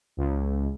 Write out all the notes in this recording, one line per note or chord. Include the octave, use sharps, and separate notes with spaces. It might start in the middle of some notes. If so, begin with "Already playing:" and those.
C#2